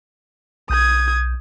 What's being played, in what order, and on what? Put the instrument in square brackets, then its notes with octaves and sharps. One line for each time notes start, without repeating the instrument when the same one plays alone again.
[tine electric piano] B1 G6 [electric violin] D#6 G#6